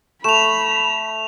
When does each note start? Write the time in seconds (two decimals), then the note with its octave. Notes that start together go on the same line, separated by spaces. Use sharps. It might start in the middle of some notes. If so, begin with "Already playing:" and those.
0.24 A3 B5 E7 F7